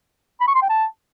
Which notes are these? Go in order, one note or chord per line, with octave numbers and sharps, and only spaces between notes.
B5
C#6
C6
G5
A5